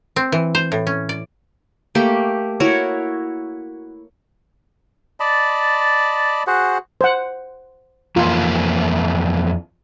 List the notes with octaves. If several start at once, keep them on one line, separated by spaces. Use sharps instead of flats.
C4
E3
C5
A2
C#4
D5
A3 A#3 G4
E4 F#4 A#4 C#5
D5 D#5 A5 B5
F#4 G#4 C5 F#5
C5 F#5
F2 E3 A#3 F4